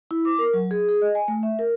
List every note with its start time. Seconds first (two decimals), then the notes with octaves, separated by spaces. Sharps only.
0.11 E4
0.25 D6
0.39 A#4
0.53 F#3
0.71 G#4
0.89 G#4
1.02 D#5
1.15 G#5
1.28 A3
1.43 E5
1.59 A#4